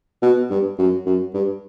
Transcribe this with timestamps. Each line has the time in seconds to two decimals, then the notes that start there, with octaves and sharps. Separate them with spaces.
0.23 B2
0.51 G2
0.79 F#2
1.06 F#2
1.34 G2